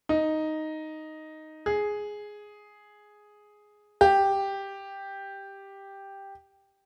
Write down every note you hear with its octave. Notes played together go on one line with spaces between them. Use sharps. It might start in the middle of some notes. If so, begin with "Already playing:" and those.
D#4
G#4
G4